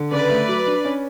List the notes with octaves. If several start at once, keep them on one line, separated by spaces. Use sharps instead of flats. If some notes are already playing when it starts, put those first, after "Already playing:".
Already playing: D3
C#3 B4 D5
A3
F#3
D4
C#4